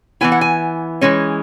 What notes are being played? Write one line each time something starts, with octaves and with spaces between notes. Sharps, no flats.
E3 B3 E4 G#5
F#5
G#5
E3 G#3 C#4